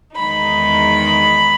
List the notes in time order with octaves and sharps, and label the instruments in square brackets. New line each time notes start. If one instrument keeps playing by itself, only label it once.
[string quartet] E2 D#3 G#3 D#4 B5